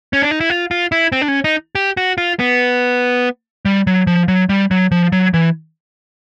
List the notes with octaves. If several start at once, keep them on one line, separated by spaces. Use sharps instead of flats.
C#4
D4
D#4
E4
F4
F4
E4
C4
D4
C#4
D#4
G4
F#4
F4
B3
G3
F#3
F3
F#3
G3
F#3
F3
F#3
E3